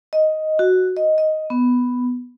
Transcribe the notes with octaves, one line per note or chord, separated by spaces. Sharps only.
D#5
F#4
D#5
D#5
B3